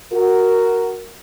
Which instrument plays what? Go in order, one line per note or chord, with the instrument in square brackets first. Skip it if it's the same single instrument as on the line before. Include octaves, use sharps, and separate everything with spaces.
[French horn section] F#4 A#4